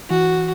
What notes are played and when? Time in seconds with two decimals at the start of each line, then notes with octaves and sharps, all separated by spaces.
0.10 E3 F#4